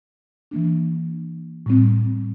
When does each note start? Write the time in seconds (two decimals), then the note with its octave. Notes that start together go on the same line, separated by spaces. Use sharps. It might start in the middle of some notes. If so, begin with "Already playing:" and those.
0.51 E3 A#3 D4
1.66 A2 G3 C4